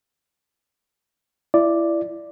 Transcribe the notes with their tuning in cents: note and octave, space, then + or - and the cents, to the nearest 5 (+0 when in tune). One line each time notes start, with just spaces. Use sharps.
E4 +25 D5 +0